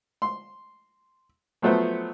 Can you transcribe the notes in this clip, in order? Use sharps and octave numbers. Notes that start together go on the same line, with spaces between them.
C6
F3 F#3 A3 B3 C5